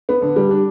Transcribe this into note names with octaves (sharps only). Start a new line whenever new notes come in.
B3
D3
G3
D4